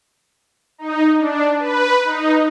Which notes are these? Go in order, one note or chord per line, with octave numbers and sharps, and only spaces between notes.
D#4
D4
B4
D#4